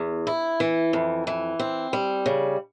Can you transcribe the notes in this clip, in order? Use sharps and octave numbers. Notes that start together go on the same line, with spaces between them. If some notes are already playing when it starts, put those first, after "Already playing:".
Already playing: E2
E4
E3
F2
E3
C4
G3
C#3